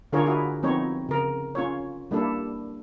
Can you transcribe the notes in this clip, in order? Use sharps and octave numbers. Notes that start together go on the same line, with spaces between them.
D3 D4 F4 G#4 A#4 C#5
E4 F#4 G#4 A#4
F3 B3 C4 D#4 C#5
C#3 A#4
C#4 F4 C#5
G3 A#3 D4 E4 A4